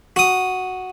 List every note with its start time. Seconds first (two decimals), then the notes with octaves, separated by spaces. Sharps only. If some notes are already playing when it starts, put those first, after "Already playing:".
0.16 F#4 D#6